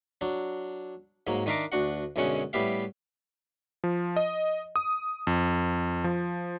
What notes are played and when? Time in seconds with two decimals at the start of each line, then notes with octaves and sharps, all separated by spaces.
0.21 F#3 D4
1.27 G#2 F#3 A#3
1.46 D#3 D4 E5 F5 A#5 D6
1.72 D2 D4 F#4 F#5
2.16 B1 F#2 D3 G#3 C#4 F#5
2.53 A2 G3 B3 G4 E5 F5
3.84 F3
4.16 D#5
4.76 D#6
5.27 F2
6.04 F3